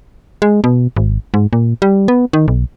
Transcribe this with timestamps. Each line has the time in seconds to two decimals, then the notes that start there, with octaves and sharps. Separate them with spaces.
0.42 G#3
0.64 B2
0.97 G#1
1.34 G#2
1.53 A#2
1.82 G3
2.08 B3
2.33 D#3
2.48 B1